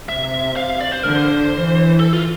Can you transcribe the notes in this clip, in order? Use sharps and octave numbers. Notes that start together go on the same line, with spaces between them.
C3 E5
F5
D5
C5
D3 A#4
C5
E3
A4
F4